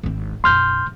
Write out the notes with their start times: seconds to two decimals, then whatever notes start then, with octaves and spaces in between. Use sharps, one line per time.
0.03 G#1 C4
0.44 B1 F#2 C6 F6 G6